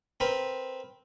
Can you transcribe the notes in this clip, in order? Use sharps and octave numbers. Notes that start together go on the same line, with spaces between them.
C4 A#4 B4